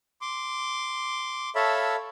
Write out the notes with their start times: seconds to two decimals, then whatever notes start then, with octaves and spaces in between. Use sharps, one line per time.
0.21 C6 D6
1.55 A4 C#5 E5 F5 A5 B5